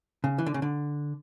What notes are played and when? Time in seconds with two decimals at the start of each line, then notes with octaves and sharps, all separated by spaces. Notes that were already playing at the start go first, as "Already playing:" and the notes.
0.24 C#3
0.38 E3
0.46 D3
0.54 C#3
0.62 D3